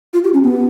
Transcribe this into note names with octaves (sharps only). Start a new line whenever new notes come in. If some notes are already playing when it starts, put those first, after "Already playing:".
F4
G4
C#4
B3